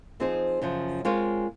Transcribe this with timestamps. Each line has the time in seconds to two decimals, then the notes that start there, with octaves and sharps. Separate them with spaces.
0.20 F3 C4 D#4 G#4 C5
0.61 F#2 C#3 F3
1.05 G#3 C4 F4 A#4 C#5